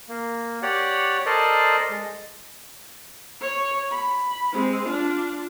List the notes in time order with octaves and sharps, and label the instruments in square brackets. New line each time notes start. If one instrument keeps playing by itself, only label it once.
[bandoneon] A#3
G4 C#5 D5 F#5
A4 A#4 C5 D5 D#5
G#3
[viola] C#5
B5
G#3 C4
D4 F4